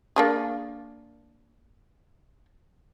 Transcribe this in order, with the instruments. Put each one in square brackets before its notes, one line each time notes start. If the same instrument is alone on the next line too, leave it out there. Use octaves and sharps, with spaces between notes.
[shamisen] A#3 D4 G#4